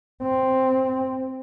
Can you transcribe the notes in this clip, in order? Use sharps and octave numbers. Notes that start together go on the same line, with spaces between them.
C4